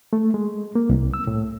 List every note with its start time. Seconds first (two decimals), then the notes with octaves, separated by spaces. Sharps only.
0.13 A3
0.34 G#3
0.75 A#3
0.90 C2
1.14 E6
1.27 A2